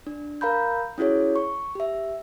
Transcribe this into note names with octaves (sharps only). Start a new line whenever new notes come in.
D4
A#4 F5 A#5 B5 G6
C#4 E4 F#4 G#4 C#5
C#6
G4 E5